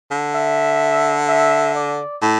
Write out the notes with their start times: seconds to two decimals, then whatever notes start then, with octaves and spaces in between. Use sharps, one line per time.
0.11 D3
0.35 E5
1.28 E5
1.75 D5
2.22 A2